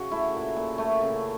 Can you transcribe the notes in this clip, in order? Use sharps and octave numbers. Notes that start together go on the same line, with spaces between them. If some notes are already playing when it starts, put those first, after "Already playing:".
Already playing: C#3 F#4
A3 E4
A#2
A#2
A3
C#3